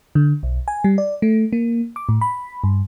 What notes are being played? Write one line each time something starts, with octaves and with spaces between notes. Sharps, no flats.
D3
B1
G#5
G3
D5
A3
A#3
D6
A2
B5
G2